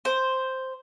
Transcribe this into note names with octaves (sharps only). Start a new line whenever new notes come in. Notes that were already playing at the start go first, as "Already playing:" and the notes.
C5